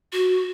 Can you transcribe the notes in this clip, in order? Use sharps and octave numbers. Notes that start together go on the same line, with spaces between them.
F#4